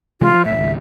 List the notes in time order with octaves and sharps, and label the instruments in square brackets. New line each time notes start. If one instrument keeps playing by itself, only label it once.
[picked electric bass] C3 E3 G#3 [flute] F4
[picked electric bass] F3
[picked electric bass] B1 A2 [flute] E5
[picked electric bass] G#1 C#2